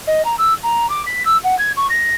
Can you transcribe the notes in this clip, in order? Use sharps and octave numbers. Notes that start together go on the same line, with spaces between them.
D#5
A#5
E6
A#5
D6
B6
E6
F#5
G#6
C#6
A#6